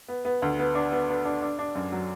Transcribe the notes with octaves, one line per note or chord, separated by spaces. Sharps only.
B3
B3
D2
B3
D4
B3
B3
D4
D4
D4
F#2
F#3